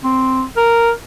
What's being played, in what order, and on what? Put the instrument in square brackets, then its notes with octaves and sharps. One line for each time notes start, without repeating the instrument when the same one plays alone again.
[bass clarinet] C4
A#4